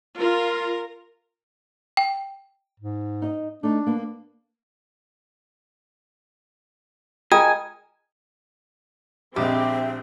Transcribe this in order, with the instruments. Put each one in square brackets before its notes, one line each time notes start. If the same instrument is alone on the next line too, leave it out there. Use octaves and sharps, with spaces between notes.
[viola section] F4 [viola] A#4
[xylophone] G5
[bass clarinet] G#2
[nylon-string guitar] D#4 D#5
[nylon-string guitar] A3 D#4 [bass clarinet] D4
[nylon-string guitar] A#3 B3
[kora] G#3 A#4 [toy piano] F4 G5 A#5 [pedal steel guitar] G#5 [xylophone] D#6
[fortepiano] A#1 G#3 D#5 [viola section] C4 [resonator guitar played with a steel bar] G4 [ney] E5